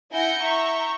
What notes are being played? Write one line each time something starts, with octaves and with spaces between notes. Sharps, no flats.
E4 F#5 G#5 G6 A#6 C#7
E5 A#5 C#6 G6